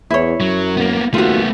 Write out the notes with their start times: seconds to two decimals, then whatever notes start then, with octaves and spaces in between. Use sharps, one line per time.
0.10 E2 E4 C#5
0.40 F#2 F#3
0.77 A#3 B3
1.14 D#2 A3 B3 F4 F#4